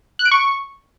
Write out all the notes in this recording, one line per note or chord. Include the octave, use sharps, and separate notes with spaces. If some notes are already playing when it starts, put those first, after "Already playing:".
F#6
D7
C#6